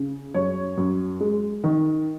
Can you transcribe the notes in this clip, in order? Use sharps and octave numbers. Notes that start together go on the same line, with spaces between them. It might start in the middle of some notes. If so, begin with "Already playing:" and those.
Already playing: C#3
F#2 C#5
F#2
G#3
D#3